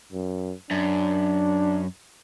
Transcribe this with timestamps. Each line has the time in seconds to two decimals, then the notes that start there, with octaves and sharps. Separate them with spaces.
0.12 F#2
0.71 F#2 D4